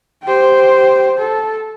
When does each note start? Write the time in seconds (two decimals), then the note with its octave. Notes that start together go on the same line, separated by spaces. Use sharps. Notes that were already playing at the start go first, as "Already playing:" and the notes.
0.23 G4 C5
1.18 A4